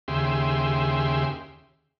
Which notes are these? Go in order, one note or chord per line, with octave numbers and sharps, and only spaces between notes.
D#2 C#3 G4 G#4 E5 C6